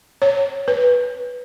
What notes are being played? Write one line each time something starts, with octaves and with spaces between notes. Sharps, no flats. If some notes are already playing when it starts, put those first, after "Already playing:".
C#5
B4